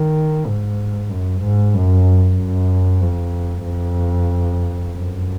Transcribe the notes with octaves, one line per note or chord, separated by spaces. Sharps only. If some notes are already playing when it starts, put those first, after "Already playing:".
Already playing: D#3
G#2
F#2
G#2
F#2
F#2
F2
F2
F#2